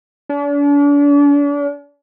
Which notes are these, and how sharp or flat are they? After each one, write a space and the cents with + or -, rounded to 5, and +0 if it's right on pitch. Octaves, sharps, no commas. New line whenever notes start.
D4 -40